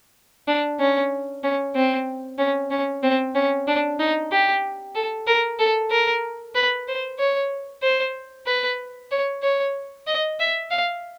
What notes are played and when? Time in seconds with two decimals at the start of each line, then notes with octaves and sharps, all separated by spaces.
0.47 D4
0.80 C#4
1.44 C#4
1.76 C4
2.39 C#4
2.71 C#4
3.03 C4
3.35 C#4
3.67 D4
3.99 D#4
4.32 G4
4.95 A4
5.27 A#4
5.59 A4
5.91 A#4
6.55 B4
6.88 C5
7.19 C#5
7.83 C5
8.47 B4
9.11 C#5
9.43 C#5
10.07 D#5
10.39 E5
10.71 F5